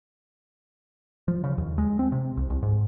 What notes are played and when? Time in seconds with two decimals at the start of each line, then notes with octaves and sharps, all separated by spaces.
1.28 F3
1.44 C#3
1.58 D#2
1.78 G#3
1.99 C4
2.12 C3
2.37 C2
2.50 C2
2.63 G#2